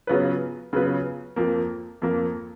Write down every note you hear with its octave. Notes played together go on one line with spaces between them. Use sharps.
C#3 F#3 B3 F4 B4
C#3 F#3 B3 F4 B4
F2 F3 A#3
F2 F3 A#3